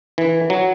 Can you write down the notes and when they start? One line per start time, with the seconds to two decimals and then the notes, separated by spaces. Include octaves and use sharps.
0.18 E3
0.50 F#3